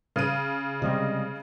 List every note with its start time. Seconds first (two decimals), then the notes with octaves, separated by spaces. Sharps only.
0.16 C#3 D#7
0.82 C3 G3 G#3 D#5